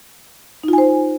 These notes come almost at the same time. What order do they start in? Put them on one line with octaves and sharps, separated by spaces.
D#4 F4 G#5 C5